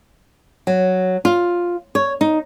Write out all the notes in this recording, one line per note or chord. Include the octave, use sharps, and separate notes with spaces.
F#3
F4
C#5
D#4